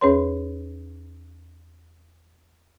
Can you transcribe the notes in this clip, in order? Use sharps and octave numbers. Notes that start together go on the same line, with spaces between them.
E2 C#4 G#4 B4 C#5 C6